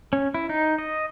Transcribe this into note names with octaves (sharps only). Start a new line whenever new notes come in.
C#4
E4
D#4
D#5